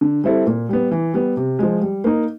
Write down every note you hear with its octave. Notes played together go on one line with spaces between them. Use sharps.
D3
G3 C4 E4 A4
A#2
G3 B3
E3
G3 B3
C3
F3 G#3
G3
A#3 D#4